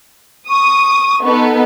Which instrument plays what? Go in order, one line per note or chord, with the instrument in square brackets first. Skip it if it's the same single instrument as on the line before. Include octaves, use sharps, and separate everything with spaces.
[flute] C#6 [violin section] D#6
[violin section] B3 D#4 A4